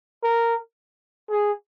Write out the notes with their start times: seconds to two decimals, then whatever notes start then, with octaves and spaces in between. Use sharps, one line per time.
0.23 A#4
1.30 G#4